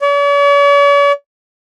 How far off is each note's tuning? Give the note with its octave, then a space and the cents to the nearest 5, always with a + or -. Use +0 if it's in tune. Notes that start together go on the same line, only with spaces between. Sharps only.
C#5 +45